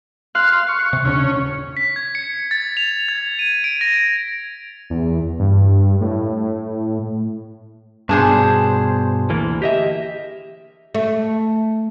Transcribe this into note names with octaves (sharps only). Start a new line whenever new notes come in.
F5 C6 F#6
C#6
C3
D#2 C#3 C#4 D4
D#1
B6
G#6
C#7
A6
F7
G#6
D#7
D7
A#6
E2
G2
A2
G2 B2 D4 G#4 C5
D2 E3 A#3
G4 D#5 E5
A3